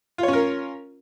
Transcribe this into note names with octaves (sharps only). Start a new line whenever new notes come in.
C#4 F4 A#4 C#5